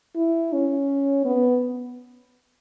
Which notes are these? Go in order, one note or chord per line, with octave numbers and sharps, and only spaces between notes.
E4
C#4
B3